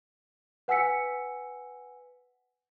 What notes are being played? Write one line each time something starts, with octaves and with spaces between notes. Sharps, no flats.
B4 F#5 G#5 E6 B6 C#7